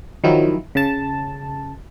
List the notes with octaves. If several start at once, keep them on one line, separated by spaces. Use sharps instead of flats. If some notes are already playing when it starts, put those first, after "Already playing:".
D#3 F3 F#3 E4
C#3 A5